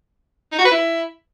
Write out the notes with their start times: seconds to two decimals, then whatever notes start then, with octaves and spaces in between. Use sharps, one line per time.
0.52 D#4
0.59 F#4
0.65 B4
0.72 E4